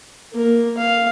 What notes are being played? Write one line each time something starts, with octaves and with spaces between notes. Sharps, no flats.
A#3 A#4
F5